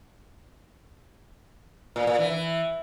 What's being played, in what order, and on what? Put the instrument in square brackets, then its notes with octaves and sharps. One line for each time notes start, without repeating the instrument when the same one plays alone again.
[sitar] A#2
A#2
E3
E3